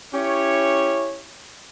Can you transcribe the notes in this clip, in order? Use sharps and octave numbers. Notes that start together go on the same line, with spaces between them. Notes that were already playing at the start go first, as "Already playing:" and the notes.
C#4 E4 G4 C#5